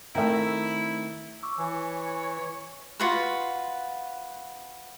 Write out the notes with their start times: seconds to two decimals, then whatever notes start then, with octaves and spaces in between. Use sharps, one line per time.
0.15 D#3 A3 C4 E4 E5 G5 A#5
1.43 C#6 D6 E6
1.58 E3 C#5 G#5
3.00 F4 F#4 B4